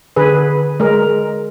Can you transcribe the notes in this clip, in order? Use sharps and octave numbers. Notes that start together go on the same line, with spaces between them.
D3 G#4 B4
G#3 A#4